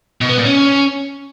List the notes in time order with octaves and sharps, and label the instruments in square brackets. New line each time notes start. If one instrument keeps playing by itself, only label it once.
[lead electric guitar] B2
B3
A#2
C#4